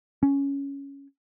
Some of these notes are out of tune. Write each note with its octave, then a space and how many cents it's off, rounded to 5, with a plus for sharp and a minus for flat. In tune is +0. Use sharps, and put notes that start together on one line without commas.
C#4 +5